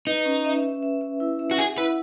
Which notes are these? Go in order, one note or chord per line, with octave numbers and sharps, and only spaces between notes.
D#4 B4
C#4
E5
E5
E5
E5
E4
E5
F#4
G#4 F#5
E4 B4